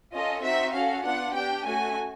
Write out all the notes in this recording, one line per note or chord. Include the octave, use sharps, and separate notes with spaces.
C#4 F4 A4 D#5
C4 D#4 F#4 E5
C#4 F#4 A4 F5
B3 D4 F4 F#5
D4 G4 G5
A3 C#4 F#4 G#5